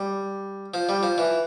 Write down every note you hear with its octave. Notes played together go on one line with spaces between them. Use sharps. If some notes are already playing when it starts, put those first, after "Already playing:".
Already playing: G3
F3
G3
F3
E3